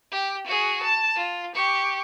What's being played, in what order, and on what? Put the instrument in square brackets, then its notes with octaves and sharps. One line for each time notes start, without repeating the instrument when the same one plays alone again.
[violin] G4
F#4 G#4
A5
F4
G4 C#6